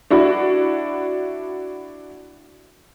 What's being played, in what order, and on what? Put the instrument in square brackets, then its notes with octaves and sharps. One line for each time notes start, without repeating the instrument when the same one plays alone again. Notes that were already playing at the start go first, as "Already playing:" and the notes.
[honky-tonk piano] D4 E4 F#4